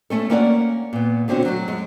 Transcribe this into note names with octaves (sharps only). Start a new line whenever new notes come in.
A3 C#4 A4
A#3 C#4 E4 A#4 D5 F#5
A#2 B3
B2 D3 C4 C#4 F#4
F#3 A3
F#2 G#3